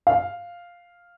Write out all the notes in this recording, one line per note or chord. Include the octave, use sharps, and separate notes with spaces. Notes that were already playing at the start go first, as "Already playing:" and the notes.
F5